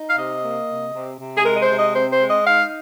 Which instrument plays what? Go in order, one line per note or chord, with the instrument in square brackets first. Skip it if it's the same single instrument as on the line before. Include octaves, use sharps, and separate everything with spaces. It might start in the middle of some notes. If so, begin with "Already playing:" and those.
Already playing: [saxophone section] D#4
F5
C3 D#5
A#3
C3
C3
C3
G#4
G#3 A#4
D#5
C5
C3
D#5
C4 C5
C5
G#3
D#5
D#4 F5